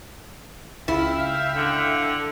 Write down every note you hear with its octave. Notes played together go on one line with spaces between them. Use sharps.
C#2 E4 E5 F5 G5
D3